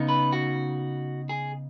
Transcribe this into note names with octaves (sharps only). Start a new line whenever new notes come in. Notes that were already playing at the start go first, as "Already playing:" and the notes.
Already playing: C#3 B3 D#4
B4
F#4
G#4